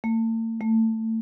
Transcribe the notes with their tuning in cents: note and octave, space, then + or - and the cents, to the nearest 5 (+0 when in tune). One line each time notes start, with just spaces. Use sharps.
A3 +45
A3 +25